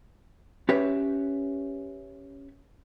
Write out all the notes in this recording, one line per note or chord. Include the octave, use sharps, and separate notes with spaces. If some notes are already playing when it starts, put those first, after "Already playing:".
C#4 G4 B4 C#5 E5